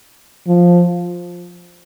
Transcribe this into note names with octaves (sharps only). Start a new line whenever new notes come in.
F3